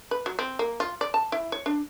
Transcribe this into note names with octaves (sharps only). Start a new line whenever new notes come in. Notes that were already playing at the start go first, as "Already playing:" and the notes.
B4
F#3
C4
A#3
F4
D5
A5
E4
C#5
D4